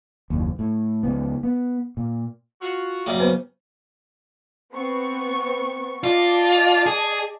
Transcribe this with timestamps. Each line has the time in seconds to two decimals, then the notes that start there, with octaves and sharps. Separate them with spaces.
0.30 F#1 D#2
0.59 A2
1.03 C#2 B3
1.43 B3
1.97 A#2
2.61 F4 F#4
3.06 F#2 C#3 G3 A#3
3.20 B3 B4 C5
4.72 B3 C4 C#6
6.03 F4 D5 D#5 A5
6.86 G#4